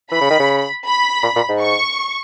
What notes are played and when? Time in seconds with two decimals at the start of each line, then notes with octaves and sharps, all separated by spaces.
0.11 E3 B5
0.21 C#3
0.30 D#3
0.40 C#3
0.87 B5
1.23 A#2
1.36 A#2
1.49 G#2
1.60 C#6